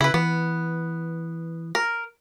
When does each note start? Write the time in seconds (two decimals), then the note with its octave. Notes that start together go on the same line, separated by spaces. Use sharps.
0.01 C#3 E4 B4
0.14 E3 B3
1.75 A#4